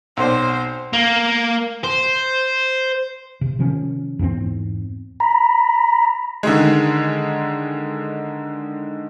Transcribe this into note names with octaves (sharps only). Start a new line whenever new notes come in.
B1 C4 C5 D5
A#3
C5
C3
C3 D#3 F3 C#4
E2 G#2 B3 C4
A#5 B5
D3 D#3 G#3